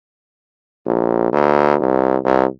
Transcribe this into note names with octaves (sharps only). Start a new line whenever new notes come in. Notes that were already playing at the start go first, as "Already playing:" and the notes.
A#1
D2
C2
C2